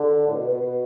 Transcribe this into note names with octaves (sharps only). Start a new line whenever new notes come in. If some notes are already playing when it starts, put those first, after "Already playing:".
Already playing: D3
A2
B2
B2
B2